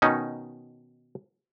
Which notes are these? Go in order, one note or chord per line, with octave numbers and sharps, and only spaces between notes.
B2 D#3 C#4 D#4